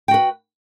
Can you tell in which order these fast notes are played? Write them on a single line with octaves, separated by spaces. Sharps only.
G5 F#4 B4